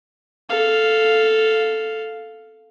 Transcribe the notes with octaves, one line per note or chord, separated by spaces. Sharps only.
A4 F5